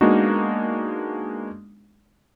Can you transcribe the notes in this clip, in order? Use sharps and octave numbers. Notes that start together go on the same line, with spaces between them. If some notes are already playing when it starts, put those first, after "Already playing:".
G#3 A#3 B3 D4 D#4 F#4